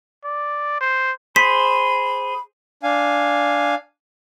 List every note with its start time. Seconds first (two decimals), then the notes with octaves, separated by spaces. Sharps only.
0.24 D5
0.81 C5
1.36 G#4 C5 B5 B6
2.83 D4 F5 G#5